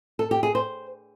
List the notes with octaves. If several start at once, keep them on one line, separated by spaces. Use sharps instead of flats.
A4
G4
G#4
C5